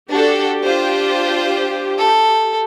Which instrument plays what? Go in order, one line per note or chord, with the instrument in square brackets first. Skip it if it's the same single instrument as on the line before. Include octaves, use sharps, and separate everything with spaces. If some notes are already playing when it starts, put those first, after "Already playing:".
[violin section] D4 F#4 A4 [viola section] G4
[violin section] D4 F4 C5
[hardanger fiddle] A4